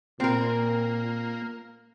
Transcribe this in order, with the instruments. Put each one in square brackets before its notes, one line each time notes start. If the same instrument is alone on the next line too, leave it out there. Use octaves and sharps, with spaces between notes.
[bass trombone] A#2 [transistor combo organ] A#3 [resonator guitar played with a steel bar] C4 A#4